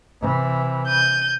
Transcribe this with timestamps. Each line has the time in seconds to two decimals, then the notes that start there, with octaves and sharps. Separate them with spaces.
0.21 C3 E3
0.88 G6 D#7